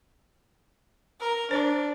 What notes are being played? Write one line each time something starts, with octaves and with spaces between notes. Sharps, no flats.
A#4
D4 C5